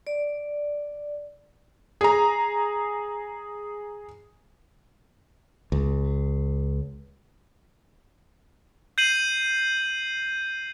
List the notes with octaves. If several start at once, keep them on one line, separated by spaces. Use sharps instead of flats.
D5
G#4 A#5
C#2
G6 C7 D#7 F#7